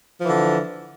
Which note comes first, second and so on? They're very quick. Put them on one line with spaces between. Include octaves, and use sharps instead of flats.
F3 E3 D3